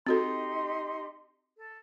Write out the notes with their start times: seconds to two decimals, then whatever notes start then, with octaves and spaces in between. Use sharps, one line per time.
0.07 C4 D#4 F#4 G4 A4 C6
1.56 A4